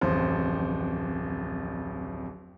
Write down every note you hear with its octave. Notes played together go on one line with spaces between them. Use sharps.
D1 A1 F2 C5